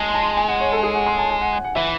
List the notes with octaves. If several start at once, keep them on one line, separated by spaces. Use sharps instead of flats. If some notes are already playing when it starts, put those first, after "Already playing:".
Already playing: G#3 G#5 A5 C6
A5
G#5
F#5
C#5
A4
G#4
F#5
C6
A5
G#5
F#5
F#5
F#5
E3 E5